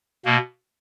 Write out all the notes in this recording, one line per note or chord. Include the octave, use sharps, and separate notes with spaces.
B2 A#3